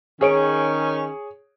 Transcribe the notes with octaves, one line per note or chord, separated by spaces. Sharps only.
D#3 C#4 G#4 C#5 D7